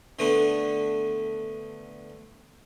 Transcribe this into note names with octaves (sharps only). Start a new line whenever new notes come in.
D3 A3 B3 D4